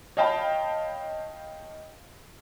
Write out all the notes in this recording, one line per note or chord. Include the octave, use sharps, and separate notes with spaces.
C#5 D#5 F5 G5 A5 B5